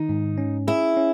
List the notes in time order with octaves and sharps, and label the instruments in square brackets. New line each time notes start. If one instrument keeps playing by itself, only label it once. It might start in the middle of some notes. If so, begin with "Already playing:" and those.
Already playing: [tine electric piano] D#3 [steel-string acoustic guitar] D#4
[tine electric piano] G#2
C#4
[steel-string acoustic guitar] E4 [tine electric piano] G#4
[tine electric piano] C#4